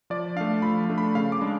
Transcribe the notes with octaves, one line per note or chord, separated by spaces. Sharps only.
F3 D5
A3 D4 F5
F3 B5
A3 D4
B5
C#3 F5
D6
G#3 D4